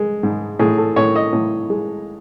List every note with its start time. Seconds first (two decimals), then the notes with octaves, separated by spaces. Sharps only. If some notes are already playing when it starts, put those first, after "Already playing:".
Already playing: G#3
0.23 G#2
0.59 A2 G#4
0.78 A4
0.96 A2 C#5
1.15 D#5
1.33 A2
1.70 G#3